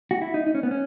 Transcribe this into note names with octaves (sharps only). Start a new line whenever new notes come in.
F#4
E4
D#4
D#4
C#4
B3
C#4